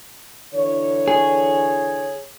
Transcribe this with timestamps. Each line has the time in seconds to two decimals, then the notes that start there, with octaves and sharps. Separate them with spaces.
0.54 D3 E3 C#5
1.08 G#4